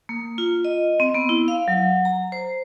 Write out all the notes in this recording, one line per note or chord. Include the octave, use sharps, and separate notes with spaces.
A#3
F4
D#5
C4
B3
E4
F5
F#3
A#5
C5